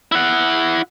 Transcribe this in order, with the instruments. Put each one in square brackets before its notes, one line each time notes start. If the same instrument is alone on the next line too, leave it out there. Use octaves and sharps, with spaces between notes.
[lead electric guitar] E4 F#5